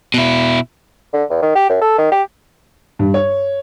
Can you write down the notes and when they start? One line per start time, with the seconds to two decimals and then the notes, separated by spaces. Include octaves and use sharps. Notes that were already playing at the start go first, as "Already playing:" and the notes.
0.14 B2 E4
1.13 D3
1.30 E2
1.42 D#3
1.55 G4
1.69 F#2
1.81 A4
1.98 D#3
2.12 G4
2.99 G2
3.14 C#5